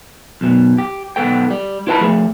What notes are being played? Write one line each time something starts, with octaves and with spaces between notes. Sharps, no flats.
B1 F#2 B2
G4
B1 D#3 B3 A4 G5
G3
E4 F4 B4 F5 A5 B5
F3 A3 G#4